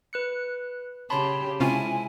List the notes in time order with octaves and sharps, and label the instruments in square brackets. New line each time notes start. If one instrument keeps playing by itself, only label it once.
[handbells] B4 F#6 C#7
[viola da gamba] C#3 G4 [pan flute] C#5 [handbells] A5 B5 C6
[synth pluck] C3 C#4 F4 [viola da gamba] G#3 E4 [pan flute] G#5